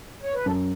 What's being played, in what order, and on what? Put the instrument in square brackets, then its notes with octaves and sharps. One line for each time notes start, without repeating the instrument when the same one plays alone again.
[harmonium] C#5
B4
[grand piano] F#2 [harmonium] A4